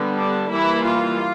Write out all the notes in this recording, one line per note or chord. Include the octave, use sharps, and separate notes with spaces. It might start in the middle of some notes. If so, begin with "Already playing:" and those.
Already playing: D3 G3 B3
D4
E3 G3 A#3 E4
F4